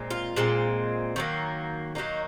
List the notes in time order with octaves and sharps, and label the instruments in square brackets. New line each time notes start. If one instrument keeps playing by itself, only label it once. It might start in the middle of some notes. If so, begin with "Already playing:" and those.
Already playing: [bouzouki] A#2 G#3 C4
F4
A#2 G#3 C4
D#3 F#3 A#3
D#3 F#3 A#3 D#4